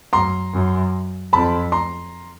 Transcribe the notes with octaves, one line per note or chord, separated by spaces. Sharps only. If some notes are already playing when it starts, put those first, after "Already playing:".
F#2 A#5 C6
F#2
F2 A5 B5
A#5 C6